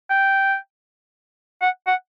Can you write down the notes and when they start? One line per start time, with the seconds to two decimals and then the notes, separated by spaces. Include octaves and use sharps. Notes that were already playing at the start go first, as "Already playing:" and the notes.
0.10 G5
1.62 F#5
1.87 F#5